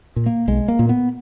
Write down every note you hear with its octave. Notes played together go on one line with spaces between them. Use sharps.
A#2
A#3
B1 G#3
A#3
A#2
B3